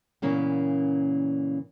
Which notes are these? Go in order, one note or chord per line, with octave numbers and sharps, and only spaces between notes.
A#2 C#3 E3 A#3 B3 C#4